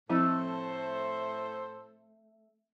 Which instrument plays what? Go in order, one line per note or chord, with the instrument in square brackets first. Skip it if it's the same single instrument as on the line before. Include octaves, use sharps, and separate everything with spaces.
[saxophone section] A2 A4 C5 [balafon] F3 C4 E4 [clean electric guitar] A3